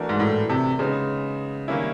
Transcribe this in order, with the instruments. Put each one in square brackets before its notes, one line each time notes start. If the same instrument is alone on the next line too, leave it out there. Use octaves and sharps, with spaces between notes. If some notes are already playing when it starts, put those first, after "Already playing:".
Already playing: [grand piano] E3 A3 D4 F#4 A#4
[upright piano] G#2
A2
C3
[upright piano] C#3 [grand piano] G#3 B3 D#4
[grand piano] D#3 G3 A#3 C#4 E4